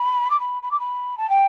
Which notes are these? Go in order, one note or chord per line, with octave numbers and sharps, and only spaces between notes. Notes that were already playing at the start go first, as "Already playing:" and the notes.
Already playing: B5
D6
B5
B5
D6
B5
A5
G5